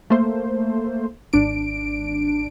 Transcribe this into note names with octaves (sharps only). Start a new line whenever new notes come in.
A3 A#3 C5
G#1 D4 D7